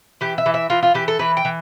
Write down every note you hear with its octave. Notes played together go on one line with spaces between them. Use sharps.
E3 G4
E5
E3
E5
E3 F4
F4
E3 G4
A4
E3 B4
G5
E3